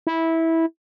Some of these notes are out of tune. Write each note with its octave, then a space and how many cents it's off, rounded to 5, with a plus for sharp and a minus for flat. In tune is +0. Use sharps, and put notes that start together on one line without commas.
E4 -15